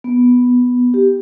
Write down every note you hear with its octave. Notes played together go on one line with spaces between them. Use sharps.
B3
G4